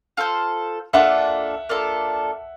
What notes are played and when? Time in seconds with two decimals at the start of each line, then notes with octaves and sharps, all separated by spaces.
0.17 F4 A4 C5
0.93 A#3 D4 F4 A4 E5 F#5
1.69 A#3 D4 F4 A4